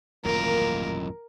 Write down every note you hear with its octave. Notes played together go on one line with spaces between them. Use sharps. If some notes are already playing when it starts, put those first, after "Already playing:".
D#1 A1 F#2 C3 A#3 F4 A#4